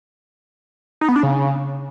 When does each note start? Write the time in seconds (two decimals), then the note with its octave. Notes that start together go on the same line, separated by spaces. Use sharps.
1.01 D#4
1.09 B3
1.16 D4
1.23 C#3